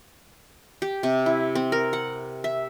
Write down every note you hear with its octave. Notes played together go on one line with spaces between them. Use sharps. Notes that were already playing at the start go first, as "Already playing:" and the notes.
G4
C3
E4
C4
A#4
F#5
E5